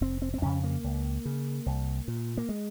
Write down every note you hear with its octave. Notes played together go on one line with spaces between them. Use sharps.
F1 C4
C4
C4
F2 C#3 C#4
A#3
C#2
C#3
C2
A#2
A#3
G#3